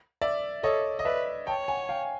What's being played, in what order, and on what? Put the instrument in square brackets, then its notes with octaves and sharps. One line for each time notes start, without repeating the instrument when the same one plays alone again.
[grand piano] D5 E5
[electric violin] A4 [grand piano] C#5 D#5
[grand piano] D#5
[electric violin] B4 [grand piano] D5 E5
[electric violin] C#5 [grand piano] G5 A5
[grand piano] F#5 G#5
F5 G5